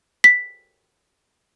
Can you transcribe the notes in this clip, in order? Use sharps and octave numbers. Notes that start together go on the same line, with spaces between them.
B6